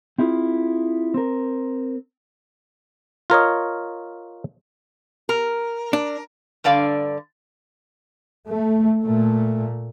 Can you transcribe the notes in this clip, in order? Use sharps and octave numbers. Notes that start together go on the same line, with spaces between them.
C4 E4 F4 G#4
C4 A#4
F4 A#4 C#5 D#5
A#4
D4
G2 D3 D5 F5
A3
A#2 A3